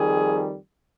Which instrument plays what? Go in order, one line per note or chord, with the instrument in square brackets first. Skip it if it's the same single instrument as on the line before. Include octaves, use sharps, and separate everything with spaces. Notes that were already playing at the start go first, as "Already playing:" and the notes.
Already playing: [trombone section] F2 D#3 G3 G#4